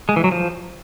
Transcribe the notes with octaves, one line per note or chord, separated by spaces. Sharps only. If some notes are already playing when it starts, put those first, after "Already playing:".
G#3
E3
F#3
F3